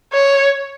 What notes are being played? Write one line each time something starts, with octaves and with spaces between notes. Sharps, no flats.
C#5